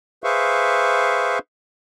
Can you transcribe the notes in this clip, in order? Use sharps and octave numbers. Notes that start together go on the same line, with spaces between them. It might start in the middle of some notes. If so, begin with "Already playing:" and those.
G#4 B4 C5 E5 F5 C#6